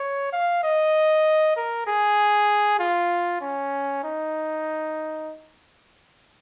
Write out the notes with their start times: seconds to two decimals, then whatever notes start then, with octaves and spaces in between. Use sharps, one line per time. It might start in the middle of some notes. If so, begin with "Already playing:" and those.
Already playing: C#5
0.32 F5
0.63 D#5
1.56 A#4
1.87 G#4
2.79 F4
3.41 C#4
4.03 D#4